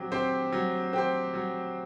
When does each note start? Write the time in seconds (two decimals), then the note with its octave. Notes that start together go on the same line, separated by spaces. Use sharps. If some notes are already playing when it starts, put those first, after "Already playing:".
Already playing: F#3 C4 G4
0.12 C4 G4 C5
0.52 F#3
0.93 C4 G4 C5
1.34 F#3